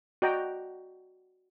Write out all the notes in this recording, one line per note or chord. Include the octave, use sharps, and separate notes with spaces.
F#4 D5 D#5 G5 A#5